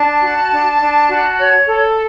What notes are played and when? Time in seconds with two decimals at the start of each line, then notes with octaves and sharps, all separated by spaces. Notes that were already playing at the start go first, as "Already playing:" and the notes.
Already playing: D4 A5
0.23 F#4
0.51 D4
0.80 D4
1.09 F#4
1.37 C#5
1.66 A4